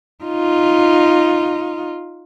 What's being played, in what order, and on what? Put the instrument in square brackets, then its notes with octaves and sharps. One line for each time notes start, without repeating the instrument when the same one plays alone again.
[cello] D#4 F4